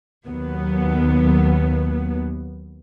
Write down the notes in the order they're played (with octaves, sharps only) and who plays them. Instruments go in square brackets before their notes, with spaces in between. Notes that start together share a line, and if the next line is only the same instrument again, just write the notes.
[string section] D#2 F#3 B3